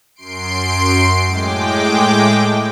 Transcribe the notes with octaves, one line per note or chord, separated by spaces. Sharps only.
F#2 C6 C7 D7
A2 G#3 G5 D6